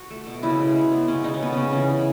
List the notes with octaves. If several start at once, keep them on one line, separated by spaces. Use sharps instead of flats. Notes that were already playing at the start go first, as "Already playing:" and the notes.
Already playing: F#4
A3
B2
C#3 E4
G#3
C#3
B3
C#3 C#4
C#3 D#4
C#4
C#3 B3
C#3 C#4
E3 C#4
C#3